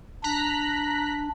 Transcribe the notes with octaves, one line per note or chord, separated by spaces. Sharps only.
D4 A#5 F#6 B6